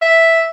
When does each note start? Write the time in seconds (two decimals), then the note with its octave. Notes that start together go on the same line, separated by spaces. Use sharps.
0.02 E5